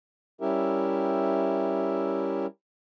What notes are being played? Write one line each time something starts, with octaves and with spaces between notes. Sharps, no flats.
G3 C#4 E4 G4 A#4 E5